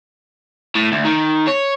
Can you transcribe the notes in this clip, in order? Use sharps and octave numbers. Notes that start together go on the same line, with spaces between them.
A2
D2
D#3
C#5